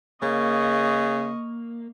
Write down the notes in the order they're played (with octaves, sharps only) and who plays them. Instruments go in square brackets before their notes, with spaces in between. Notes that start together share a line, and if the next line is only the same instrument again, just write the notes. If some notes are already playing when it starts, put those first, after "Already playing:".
[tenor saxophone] C#3 [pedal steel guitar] A#3 [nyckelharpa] D#5 C#6